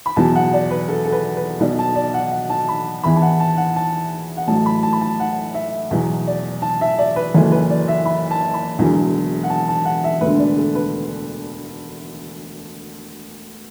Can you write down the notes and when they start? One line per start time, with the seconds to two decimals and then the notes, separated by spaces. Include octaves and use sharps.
0.06 B5
0.16 E2 B2 F#3 A5
0.35 F#5
0.53 D5
0.71 B4
0.88 A4
1.05 A4
1.12 B4
1.37 B4
1.60 B1 B2 F#3 D5
1.79 A5
1.96 D5
2.14 F#5
2.31 F#5
2.50 A5
2.69 B5
3.04 E2 E3 B5
3.16 A5
3.22 F#5
3.40 A5
3.57 F#5
3.76 A5
4.37 F#5
4.47 A1 A2 F#3 A5
4.66 B5
4.83 A5
4.93 B5
5.01 A5
5.20 F#5
5.54 E5
5.91 E2 B2 F#3
6.27 D5
6.62 A5
6.81 E5
6.98 D5
7.16 B4
7.34 F#1 F#2 E3 A4
7.52 B4
7.70 D5
7.88 E5
8.06 B5
8.31 A5
8.54 B5
8.79 E1 E2 D3 F#3
9.43 F#5
9.50 A5
9.68 A5
9.85 F#5
10.04 E5
10.21 E1 D2 D3 B4
10.39 D5
10.57 A4
10.75 B4